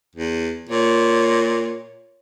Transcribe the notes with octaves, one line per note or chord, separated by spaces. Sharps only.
E2
A#2 C#5